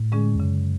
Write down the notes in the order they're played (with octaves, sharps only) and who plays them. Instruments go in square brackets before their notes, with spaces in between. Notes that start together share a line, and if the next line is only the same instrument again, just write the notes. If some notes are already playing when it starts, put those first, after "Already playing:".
Already playing: [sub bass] A2
[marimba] D3 G#3 C#4 G#4
[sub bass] E2
[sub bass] F#2 [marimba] C#3